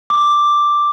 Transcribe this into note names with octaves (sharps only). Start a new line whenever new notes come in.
D6